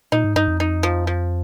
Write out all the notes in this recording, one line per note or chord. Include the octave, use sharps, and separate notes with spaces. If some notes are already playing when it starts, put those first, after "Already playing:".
A#2 D#4
G#2
G2 D#4
F2
D#4
F3
F3